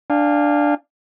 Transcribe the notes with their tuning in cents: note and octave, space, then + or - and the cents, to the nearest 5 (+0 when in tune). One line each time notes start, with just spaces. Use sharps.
D4 +0 F5 +0 G#5 -35